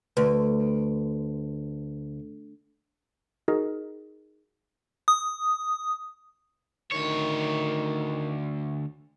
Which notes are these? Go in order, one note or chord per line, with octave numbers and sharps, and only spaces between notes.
D2 B4
D#4 F#4 G#4 A#4 D#5
D#6
D2 D#3 C#5